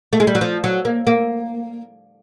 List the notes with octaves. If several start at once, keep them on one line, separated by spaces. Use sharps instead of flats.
A3
G#3
G3
F#3
F3
F#3
A#3
A#3